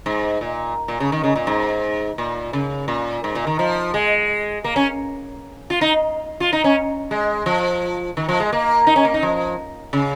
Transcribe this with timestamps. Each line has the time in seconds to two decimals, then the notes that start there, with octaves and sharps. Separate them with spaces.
0.06 G#2
0.41 A#2
0.88 A#2
1.00 C#3
1.12 D#3
1.24 C#3
1.35 A#2
1.47 G#2
2.18 A#2
2.53 C#3
2.88 A#2
3.24 G#2
3.35 A#2
3.47 D#3
3.59 F3
3.94 G#3
4.64 A#3
4.76 C#4
5.70 F4
5.81 D#4
6.40 F4
6.53 D#4
6.64 C#4
7.11 G#3
7.46 F3
8.17 D#3
8.29 F3
8.40 G#3
8.52 A#3
8.87 D#4
8.96 C#4
9.05 A#3
9.14 D#4
9.23 F3
9.93 C#3